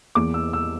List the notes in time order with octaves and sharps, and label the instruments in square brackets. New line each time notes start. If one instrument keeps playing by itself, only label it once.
[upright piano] E2 E3 A#3 D6
E6
E6